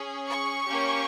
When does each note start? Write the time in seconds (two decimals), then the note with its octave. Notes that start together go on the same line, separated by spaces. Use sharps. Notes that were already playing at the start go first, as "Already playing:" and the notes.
Already playing: C#4 G#4
0.27 C#6
0.66 A#3 C#4 G4